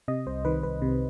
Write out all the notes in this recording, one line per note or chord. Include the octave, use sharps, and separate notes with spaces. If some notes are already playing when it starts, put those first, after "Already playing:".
C3 D#5
C2 C5
D#3 B4
C2 B4
C3